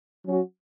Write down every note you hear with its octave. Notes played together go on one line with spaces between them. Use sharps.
F#3 C#4 F#4